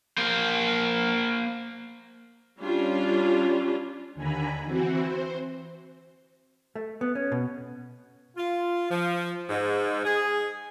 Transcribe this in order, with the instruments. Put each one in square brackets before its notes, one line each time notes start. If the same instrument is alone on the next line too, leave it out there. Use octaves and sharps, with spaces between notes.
[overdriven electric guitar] A#3 C5
[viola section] G3 C#4 D4 F4
[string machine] D#2 D3 G#5 A#5 B5
E3 C4 F#4
C5
[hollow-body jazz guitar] A3
B3
C#4
B2
[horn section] F4
F3
G#2
G#4